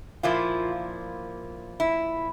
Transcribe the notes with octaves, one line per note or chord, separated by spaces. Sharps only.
A#2 F3 A#3 E4 F4
E4